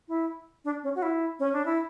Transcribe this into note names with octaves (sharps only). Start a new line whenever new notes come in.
E4
D4
C#4
F#4
E4
C#4
D4
E4